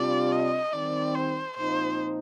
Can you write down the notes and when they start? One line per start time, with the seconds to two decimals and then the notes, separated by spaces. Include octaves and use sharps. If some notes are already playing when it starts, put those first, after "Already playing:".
Already playing: C3 G3 D4 F4 D5
0.32 D#5
0.73 D#3 G3 C4 D5
1.15 C5
1.57 A#2 F3 C4 D#4 C5